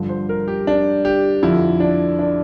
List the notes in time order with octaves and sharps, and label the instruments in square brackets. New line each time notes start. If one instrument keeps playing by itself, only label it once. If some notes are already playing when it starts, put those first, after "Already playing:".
Already playing: [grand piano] G2 D3 F3
C5
A#4
G4
D4
G4
F2 D3 F3 E4
D4
D4